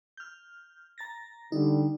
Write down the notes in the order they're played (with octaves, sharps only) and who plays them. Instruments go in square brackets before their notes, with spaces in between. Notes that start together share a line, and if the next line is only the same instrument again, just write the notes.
[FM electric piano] F6 G6
A#5 A6 A#6
[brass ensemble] D3 G3 [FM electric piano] D#4